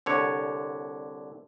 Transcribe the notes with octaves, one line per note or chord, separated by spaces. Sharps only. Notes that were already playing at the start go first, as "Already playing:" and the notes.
C2 D3 C#5